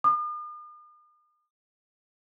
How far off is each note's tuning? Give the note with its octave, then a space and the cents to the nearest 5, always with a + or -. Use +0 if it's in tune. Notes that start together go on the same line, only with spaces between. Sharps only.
D#6 -45